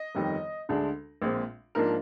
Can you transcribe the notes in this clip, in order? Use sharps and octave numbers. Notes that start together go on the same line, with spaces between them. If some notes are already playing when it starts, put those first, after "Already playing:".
Already playing: D#5
G1 F2 D#3 G3
D2 D3 G#3 D4
A#1 A#2 G#3 C4
G#2 F3 A#3 D4 A#4